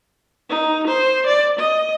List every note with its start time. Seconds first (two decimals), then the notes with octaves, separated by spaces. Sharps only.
0.50 D#4
0.87 C5
1.26 D5
1.59 D#5